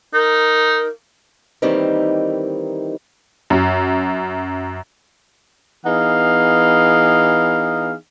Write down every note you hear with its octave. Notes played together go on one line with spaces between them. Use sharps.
D#4 A#4
D#3 E3 G3 A#3 C4 D#4
F#2
E3 B3 D#4 G#4 F5